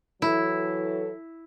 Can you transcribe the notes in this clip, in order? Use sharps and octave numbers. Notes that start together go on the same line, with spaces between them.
E3 F#3 E4 A4